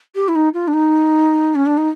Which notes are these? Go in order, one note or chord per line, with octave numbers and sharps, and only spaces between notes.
G4
E4
D#4
F4
D4
D#4
C#4
D4
D#4